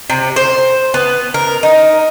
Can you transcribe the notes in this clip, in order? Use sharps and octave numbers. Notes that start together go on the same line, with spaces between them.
C3
C5
B3
A#4
D#4